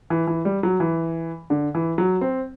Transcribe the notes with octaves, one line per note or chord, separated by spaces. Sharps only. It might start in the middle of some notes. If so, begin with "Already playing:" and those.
E3
E3
G3
F#3
E3
D3
E3
F#3
C4